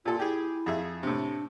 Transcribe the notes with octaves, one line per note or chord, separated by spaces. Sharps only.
A#2 F4 A4
E4 G4 G#4
F2 G#4 E5
A2 C3 D4